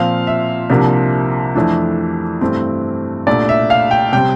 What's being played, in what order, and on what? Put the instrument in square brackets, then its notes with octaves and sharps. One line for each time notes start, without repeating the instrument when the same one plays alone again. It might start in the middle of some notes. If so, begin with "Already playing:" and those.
Already playing: [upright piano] A#2 F3 C4 F5
E5
C2 C3 F3 A#3 D4
F2 E3 A3 D4
G2 E3 A3 C4
C2 A#2 A3 D4 D5
E5
F5
G5
C3 G3 C4 G5